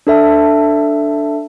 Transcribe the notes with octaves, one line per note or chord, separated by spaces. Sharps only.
D4 A4 E5 A5